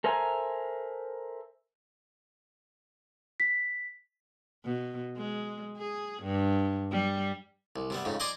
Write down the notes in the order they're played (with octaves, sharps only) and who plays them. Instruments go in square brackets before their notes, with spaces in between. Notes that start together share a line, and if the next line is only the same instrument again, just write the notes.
[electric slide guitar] A4 A#4 C5 E5 G#5 A#5
[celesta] B6
[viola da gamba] B2
G#3
G#4
G2
G3
[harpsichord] C2
C3 G3 B3
F2 G#2 C#3
D5 D#5 G#5 A#5 C6 D6